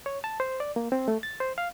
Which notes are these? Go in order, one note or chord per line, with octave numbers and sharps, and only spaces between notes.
C#5
A5
C5
D5
A#3
C4
A3
A6
C5
F5